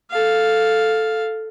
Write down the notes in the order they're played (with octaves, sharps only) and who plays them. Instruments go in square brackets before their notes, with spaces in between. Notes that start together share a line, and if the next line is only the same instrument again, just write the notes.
[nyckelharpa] A4 F5